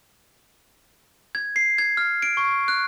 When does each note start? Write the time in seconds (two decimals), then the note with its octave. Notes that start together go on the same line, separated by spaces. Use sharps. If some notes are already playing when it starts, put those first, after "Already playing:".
1.35 G#6
1.56 C7
1.78 G#6
1.97 F6
2.22 D7
2.37 C#6
2.68 F#6